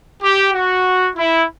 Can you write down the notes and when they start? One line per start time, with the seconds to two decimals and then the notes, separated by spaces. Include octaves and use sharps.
0.23 G4
0.54 F#4
1.16 E4